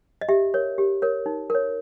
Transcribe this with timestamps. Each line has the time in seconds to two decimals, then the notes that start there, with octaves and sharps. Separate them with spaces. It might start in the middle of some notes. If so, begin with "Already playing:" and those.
0.21 D#5
0.29 G4 E5
0.54 A#4 C#5
0.78 G4
1.02 A#4 C#5
1.26 D#4
1.50 A#4 C#5